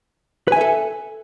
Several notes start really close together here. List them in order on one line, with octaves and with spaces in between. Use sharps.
B4 G#5 E5 A4